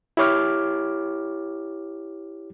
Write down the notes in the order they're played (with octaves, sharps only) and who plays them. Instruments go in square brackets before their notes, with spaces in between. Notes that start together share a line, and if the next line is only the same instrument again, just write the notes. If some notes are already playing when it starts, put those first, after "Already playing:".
[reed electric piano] E4 G4 C#5 D6 F6